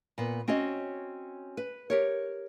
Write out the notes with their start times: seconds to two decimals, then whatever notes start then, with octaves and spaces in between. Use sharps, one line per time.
0.18 A#2 B3
0.48 C4 C#4 F#4 C#5 D#5
1.57 B4
1.90 G4 A#4 C#5